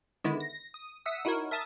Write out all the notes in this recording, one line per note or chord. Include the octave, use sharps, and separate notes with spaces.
D3 D#3 G#3 B3 E4
A#6
D#6
E5 F#5 D#6 E6
D#4 E4 F#4 A#4 C#5
A#4 E5 A5 D#6 A6